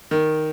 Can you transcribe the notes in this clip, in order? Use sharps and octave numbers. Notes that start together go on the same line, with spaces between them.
D#3